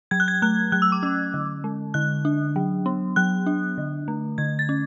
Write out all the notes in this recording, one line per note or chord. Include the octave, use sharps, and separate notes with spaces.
F#3 G#6
F#6
G#6
A3 F#6
F#3 F#6
E6
D6
C#4 E6
D3
G#3
D3 F#6
D4
F#3
B3
F#3 F#6
D4
D3
A3
D3 G#6
A6
C#4